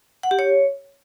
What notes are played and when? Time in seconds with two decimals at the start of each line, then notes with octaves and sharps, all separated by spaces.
0.23 F#5
0.31 G4
0.39 C#5